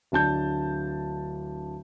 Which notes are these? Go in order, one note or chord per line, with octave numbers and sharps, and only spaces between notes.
D1 D4 A5 G6